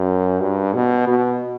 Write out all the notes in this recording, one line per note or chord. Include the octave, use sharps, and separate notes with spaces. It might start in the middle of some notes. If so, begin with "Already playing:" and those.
Already playing: F#2
G2
B2
B2